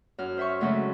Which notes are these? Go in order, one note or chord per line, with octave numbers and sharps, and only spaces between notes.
F#2 F6
C5 E5 C#6
C#3 F#3 G#3 A3 C4 C#4